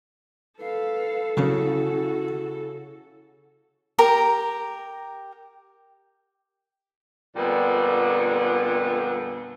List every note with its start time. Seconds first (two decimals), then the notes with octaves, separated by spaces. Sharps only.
0.60 A4 B4 F5
1.37 F#2 C#3 A#3 C#4 E4 F#4
3.99 G4 A#4 A#5
7.36 F2 A#2 D3 G3 B3 D4